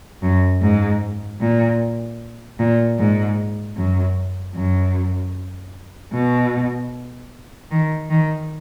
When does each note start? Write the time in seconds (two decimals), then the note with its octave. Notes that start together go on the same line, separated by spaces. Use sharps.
0.22 F#2
0.62 G#2
1.41 A#2
2.59 A#2
2.99 G#2
3.77 F#2
4.55 F#2
6.13 B2
7.71 D#3
8.10 D#3